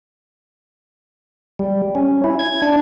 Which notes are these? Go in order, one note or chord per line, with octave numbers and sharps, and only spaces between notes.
G3
C#4
E4
G#6
D4